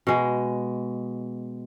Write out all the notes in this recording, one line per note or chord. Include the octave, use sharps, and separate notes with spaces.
B2 G#3